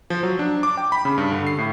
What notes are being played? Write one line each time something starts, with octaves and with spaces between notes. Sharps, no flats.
F3
F#3
D4
D6
G5
B5
C#3
G2
D3
C7
A2